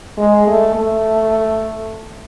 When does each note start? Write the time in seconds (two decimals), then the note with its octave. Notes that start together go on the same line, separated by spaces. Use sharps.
0.18 G#3
0.47 A3
0.75 A3